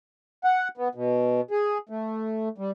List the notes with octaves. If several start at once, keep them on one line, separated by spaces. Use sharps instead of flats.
F#5
B3
B2
G#4
A3
G3